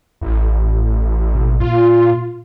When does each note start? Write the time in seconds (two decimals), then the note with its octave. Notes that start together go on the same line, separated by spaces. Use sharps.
0.21 A1
1.35 B2
1.60 A#2 F4